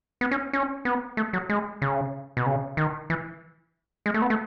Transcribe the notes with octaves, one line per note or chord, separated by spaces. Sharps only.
B3
C#4
C#4
B3
A3
F#3
G#3
C#3
B2
C#3
D#3
E3
G#3
A3
B3
A3